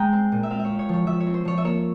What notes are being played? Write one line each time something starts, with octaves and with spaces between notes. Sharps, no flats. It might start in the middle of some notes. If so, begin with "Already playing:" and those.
Already playing: G#3 G5 A#5
C4
A#2
E5
C4 F5
E5
C4 C#5
C#5
F3 C#5
F3 E5
C#5
C4
C5
F3 C#5
E5
A#3 C#5